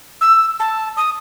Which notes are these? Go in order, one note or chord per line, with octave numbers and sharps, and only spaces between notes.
E6
A5
D#6